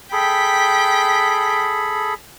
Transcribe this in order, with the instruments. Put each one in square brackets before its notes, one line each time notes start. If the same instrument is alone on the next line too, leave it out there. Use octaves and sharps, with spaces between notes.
[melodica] G#4 A4 B5 [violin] G5 B6